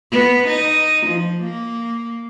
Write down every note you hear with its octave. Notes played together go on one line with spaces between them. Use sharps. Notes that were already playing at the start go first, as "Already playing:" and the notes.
B3
D#4
F3
A#3